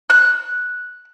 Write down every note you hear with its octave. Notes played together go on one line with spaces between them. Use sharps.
F#6